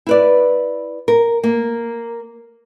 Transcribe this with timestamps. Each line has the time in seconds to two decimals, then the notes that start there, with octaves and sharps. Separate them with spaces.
0.07 E4 B4 D5
1.08 A#4
1.44 A#3